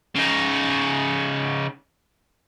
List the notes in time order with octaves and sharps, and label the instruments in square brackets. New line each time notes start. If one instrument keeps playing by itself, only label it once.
[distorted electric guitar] C#3 D#4